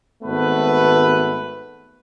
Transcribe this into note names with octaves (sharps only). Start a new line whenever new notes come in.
G#1 A3 B3 B4